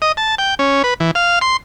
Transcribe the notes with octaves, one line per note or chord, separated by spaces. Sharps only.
D#5
A5
G5
C#4
B4
E3
F5
C6